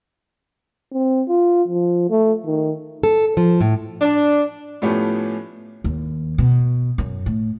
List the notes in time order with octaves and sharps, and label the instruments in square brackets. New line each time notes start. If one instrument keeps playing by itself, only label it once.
[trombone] C4
F4
F3
A3
D#3
[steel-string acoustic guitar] A4
F3
A2
[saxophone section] D4
[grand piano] A2 F3 A3 B3 C#4 G4
[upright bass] D#2
B2
F#2
A2